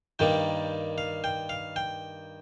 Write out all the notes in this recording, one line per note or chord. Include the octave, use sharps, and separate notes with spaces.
G2 D#3 G3 A#3 G5
F5
G5
F5
G5